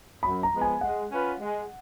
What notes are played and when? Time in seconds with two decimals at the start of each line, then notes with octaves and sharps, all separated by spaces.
0.23 F#2 B5
0.43 A#5
0.52 F3 G#3 B3
0.61 G#5
0.81 G#3 F#5
1.11 C#4 F4 B4
1.40 G#3